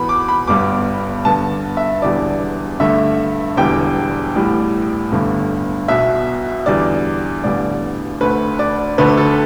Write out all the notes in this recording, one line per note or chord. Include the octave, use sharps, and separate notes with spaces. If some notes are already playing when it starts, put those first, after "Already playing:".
Already playing: E2 B2 B3 B5
D6
B5
G1 G2 G3 B3 D6
G2 D3 B3 A5
E5
E1 E2 D3 G3 B3 D5
G2 D3 A3 E5
E1 E2 D3 G3 G5
A1 A2 G3
G1 G2 D3 A3
B1 B2 B3 E5
E2 D3 G3 D5
A1 G2 D3 G3 B3 D5
D2 D3 A3 B4
D5
D2 D3 A3 B4
A4